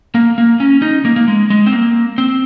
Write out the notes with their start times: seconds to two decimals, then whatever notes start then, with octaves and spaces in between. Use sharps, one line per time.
0.15 A#3
0.38 A#3
0.60 C#4
0.82 D#4
1.05 A#3
1.16 A#3
1.28 G#3
1.50 G#3
1.66 C4
1.72 A#3
2.18 C4